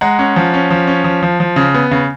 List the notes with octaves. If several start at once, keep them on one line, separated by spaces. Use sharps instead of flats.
G#3 F#5 A#5
C#4
F3
C#4
F3
C#4
F3
F3
F3
C#3
B3
C#3